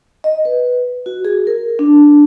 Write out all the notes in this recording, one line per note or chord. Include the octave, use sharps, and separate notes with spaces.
D#5
B4
F#4
G#4
A#4
D4